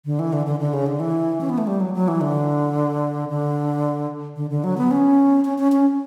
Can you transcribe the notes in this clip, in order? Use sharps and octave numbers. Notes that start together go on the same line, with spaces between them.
D3
E3
D3
D3
D3
C#3
D3
E3
C#4
B3
A3
G3
F#3
F#3
E3
D3
D3
D3
D3
F#3
B3
C#4
C#4
C#4
C#4